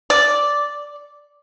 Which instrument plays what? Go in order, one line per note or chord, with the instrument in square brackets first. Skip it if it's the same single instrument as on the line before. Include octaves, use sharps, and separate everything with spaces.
[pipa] D5